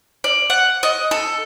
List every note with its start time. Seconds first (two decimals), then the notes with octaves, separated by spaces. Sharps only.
0.24 D5
0.50 F#5
0.83 D#5
1.11 A4